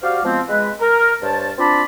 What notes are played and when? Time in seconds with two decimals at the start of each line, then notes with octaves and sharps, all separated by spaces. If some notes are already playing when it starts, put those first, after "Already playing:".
0.03 F#4 G4 C5 D5 F5
0.24 F3 G#3 B3 C4
0.49 G#3 B4
0.81 A#4
1.22 G2 C5 C#5 A5
1.58 C4 D4 F4 D5 A5 B5